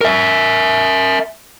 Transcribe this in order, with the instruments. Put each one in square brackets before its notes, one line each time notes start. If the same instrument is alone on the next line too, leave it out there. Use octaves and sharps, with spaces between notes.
[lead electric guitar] A#4 E5